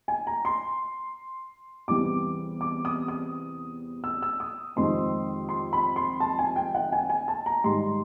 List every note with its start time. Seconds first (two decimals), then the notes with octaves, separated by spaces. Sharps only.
0.08 G#5
0.27 A#5
0.45 C6
1.88 E2 C3 E3 G3 D6
2.61 D6
2.85 D#6
3.08 D#6
4.04 E6
4.22 E6
4.40 D#6
4.76 F2 C3 D#3 G#3 C4 C6
5.49 C6
5.73 B5
5.96 C6
6.20 A5
6.39 G#5
6.56 G5
6.75 F#5
6.92 G#5
7.10 G#5
7.28 A5
7.46 A#5
7.64 G#2 D#3 G3 C6